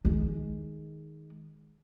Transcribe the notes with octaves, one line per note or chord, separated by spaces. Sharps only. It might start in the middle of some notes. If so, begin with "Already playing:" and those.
D#3 G#3